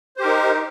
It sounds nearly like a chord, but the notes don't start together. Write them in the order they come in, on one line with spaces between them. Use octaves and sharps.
C5 G4 A#4 D#4